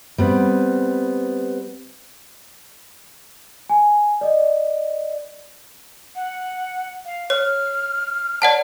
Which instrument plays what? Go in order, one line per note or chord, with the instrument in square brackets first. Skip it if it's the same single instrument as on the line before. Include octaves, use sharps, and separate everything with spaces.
[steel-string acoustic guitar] G3 B3 C4
[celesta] G#5
D5 D#5
[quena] F#5
F5
[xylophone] C#5 [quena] F6
[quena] C#5 [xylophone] D5 F#5 A5